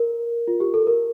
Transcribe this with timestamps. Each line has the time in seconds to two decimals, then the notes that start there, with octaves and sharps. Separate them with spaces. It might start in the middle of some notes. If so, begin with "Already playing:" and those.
Already playing: A#4
0.48 F4
0.60 G4
0.74 A4
0.87 A#4